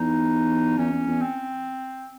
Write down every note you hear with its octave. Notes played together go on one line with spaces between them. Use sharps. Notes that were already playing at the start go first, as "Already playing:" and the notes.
Already playing: E2 D#4
E2 C#4
E2
E2
C4